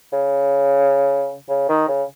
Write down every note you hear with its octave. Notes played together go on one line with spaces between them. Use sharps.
C#3
C#3
D#3
C#3